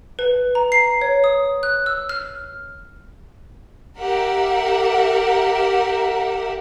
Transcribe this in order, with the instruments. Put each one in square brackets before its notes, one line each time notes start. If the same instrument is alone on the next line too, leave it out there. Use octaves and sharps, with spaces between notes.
[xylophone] B4
A#5
C7
C#5
D#6
F#6
E6
F6
[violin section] G4 A#4 E5 F#5